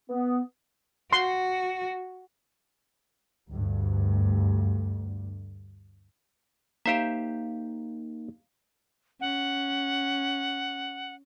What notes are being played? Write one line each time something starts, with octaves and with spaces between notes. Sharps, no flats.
B3
F#4 C6
D2 G2
A#3 D#4 G4 C5 E5 F5 A#5
C#4 F#5